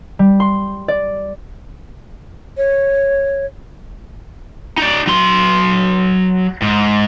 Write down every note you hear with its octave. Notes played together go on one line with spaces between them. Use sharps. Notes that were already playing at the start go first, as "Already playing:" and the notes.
G3
C6
D5
C#5
D#4 D5
F#3 C6
G#2